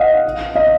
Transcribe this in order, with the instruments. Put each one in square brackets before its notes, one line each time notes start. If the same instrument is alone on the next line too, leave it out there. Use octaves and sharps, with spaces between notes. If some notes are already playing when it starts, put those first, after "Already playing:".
Already playing: [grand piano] D#5 F5 F#5
D#5 F5